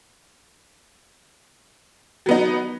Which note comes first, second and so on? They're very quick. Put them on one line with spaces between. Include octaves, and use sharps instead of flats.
F#3 B3 D#4